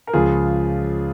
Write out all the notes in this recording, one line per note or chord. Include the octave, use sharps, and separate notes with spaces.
A#4
C#2 C#3 F3 F4 G#4